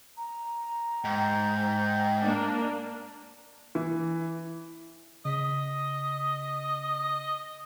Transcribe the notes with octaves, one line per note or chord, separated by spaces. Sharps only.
A#5
G#2 G5
A#3 D4
E3
C#3 D#5 B6